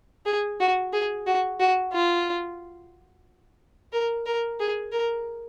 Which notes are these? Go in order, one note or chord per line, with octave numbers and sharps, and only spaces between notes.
G#4
F#4
G#4
F#4
F#4
F4
A#4
A#4
G#4
A#4